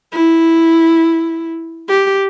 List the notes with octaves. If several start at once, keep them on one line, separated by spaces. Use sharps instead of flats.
E4
G4